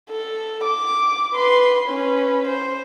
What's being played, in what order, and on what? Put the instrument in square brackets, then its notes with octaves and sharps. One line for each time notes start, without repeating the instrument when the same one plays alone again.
[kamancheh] A4
D6
B4 C6
C#4 B4
C5